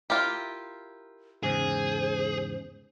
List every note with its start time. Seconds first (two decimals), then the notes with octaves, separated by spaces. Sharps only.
0.10 E4 F4 G4 A#4
1.43 E2 G#2 C#3 G#4 C5